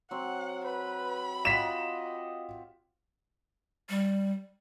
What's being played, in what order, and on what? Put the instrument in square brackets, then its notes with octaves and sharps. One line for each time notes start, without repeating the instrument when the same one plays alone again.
[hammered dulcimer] F#3 C4 [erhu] F#5
[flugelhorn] B4 [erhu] B5
[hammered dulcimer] F4 G4 F#5 [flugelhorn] D#5 [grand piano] B6 E7
[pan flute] G3